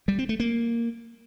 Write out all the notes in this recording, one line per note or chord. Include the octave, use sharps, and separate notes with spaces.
G3
C4
A3
A#3